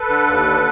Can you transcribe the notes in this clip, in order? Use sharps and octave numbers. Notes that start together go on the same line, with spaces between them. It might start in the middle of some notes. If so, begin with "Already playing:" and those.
Already playing: A4 B4
D3
D#2
D3